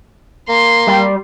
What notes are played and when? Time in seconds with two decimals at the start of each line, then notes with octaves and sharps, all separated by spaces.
0.49 A#3 C6
0.87 G3